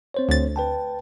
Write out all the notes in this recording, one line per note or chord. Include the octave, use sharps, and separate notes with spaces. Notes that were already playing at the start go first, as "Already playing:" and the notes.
C4 C5 C#5
D2 A6
B4 G5 A5